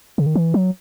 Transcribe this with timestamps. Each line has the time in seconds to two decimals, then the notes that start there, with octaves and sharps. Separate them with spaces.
0.18 C#3
0.26 D#3
0.35 E3
0.54 F#3